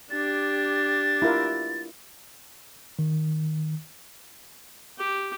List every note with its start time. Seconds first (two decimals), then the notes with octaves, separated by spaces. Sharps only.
0.11 D4 G4 A6
1.22 E4 F4 A#4
2.99 D#3
4.99 G4